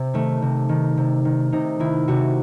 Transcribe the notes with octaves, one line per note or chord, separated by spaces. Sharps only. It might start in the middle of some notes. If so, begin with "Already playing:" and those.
Already playing: C3
D#3 A3
C3
D#3
C3
D#3
C3 D#4
D#3 E4
C3 F#4